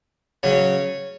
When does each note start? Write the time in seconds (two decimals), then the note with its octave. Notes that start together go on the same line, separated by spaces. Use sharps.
0.43 C#3 F#3 C#4 C#5